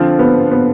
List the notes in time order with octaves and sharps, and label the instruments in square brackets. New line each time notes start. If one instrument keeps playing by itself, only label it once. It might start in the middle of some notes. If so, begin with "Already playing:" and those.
Already playing: [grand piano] D3 F3 C4 F4
[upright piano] B3
B3